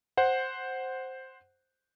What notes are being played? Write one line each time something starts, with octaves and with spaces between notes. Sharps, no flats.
C5 F#5